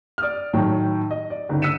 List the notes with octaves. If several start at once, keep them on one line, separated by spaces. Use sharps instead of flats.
D5 D#6 F6
A2 D#3 F#3 G5
D#5
D5
G1 C#2 D#4
E6 F#6 B6 C#7 D#7 E7